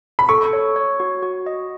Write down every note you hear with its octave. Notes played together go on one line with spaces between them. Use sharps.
B5
A4 C#6
C#5
C#5
F#4
F#4
D#5